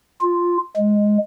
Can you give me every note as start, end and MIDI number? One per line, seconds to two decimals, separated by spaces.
0.21 0.57 65
0.77 1.18 56